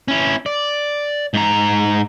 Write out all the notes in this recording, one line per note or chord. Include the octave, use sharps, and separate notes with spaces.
C#4 E4
D5
G#2 A#5